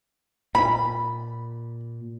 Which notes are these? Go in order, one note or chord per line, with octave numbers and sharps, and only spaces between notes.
A#2 B5